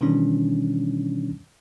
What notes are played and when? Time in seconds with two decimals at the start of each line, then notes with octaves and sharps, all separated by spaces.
0.01 B2 D#3 E3 G3 C#4 D4